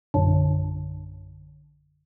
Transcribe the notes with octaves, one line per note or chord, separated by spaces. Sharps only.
A#1 F#2 D3